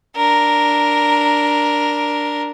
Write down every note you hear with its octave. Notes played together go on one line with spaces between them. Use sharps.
D4 A#4